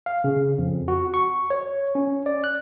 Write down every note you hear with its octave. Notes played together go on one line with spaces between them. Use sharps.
F5
C#3
F2
F#4
C#6
C#5
C#4
D5
F#6